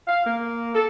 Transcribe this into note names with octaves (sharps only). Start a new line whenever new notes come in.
F5
A#3
A4